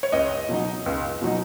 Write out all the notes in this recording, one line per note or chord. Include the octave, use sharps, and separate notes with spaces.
C#5
C#2 D#5
B2 F#3 D#4
C#2
B2 F#3 D#4